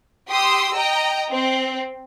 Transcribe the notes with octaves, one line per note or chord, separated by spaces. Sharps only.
G4 C6 D#6 E6
D#5 G5 A#5
C4